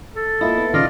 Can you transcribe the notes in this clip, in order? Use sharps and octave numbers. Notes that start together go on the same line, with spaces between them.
A4
A#3 E4 F4 D#5
B3
D#2 A#2 C#3 F4 D5 D#5 F5